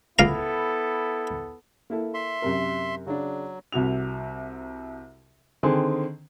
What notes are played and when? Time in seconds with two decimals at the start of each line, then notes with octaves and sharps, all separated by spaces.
0.19 C#2 B3 E4 A4 F5 A#5
1.90 A#3 E4 A4
2.14 E5 C6
2.42 F#2 C3 A#4
3.06 C#3 F#3 D4
3.72 C2 C3 F#4 F7
5.63 D3 D#3 C4 G#4